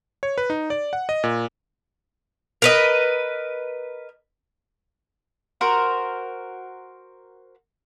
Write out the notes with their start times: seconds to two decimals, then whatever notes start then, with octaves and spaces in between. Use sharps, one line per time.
0.23 C#5
0.38 B4
0.50 D#4
0.70 D5
0.93 F#5
1.09 D#5
1.24 A#2
2.62 A#4 B4 D#5
5.61 F#4 A#4 C5